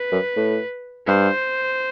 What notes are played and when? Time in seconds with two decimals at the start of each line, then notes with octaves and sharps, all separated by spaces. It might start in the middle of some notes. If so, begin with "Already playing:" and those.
Already playing: B4
0.12 F#2
0.36 A2
1.07 G2 C5